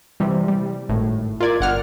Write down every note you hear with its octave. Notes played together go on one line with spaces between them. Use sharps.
C3 E3 G3
G3
G#1 A2
F4 A#4 D5 G#6
G1 F#5 F6